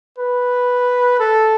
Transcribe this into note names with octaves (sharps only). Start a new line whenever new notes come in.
B4
A4